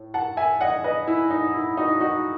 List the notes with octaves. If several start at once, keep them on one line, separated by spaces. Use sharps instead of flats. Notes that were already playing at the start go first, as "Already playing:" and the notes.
Already playing: A2
F#5 A5
E5 G#5
D#5 F#5
B4 D#5
E4
D#4
E4
D#4 F#4
D#4 F#4